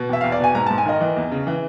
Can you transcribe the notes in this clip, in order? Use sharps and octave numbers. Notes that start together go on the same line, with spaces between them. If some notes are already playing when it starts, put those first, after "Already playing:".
Already playing: B2
E2 E5
E2 F5
D5
B2 G#5
G#2 A#5
G#2 A5
G#5
D#3 D#5
E3
E2
C#3
E3